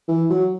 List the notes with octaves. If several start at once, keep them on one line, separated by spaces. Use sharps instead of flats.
E3
F#3